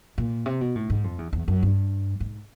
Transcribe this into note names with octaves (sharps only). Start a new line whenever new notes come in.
A#2
C3
B2
A2
G#2
F2
E2
E2
F#2
G2
G#2